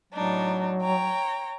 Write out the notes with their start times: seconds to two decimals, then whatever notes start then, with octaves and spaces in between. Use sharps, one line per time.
0.12 A2 F#3 D4 D#4
0.80 C#5 G5 A#5